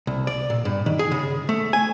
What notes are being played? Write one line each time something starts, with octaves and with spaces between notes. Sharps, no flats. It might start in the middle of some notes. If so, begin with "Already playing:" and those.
C2
D5
A#2
G2
D#3
G#4
C#3
A3
G#5